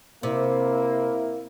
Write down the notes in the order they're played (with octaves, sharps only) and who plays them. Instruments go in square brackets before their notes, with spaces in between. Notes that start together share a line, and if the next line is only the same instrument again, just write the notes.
[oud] C3 [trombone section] A#3 E4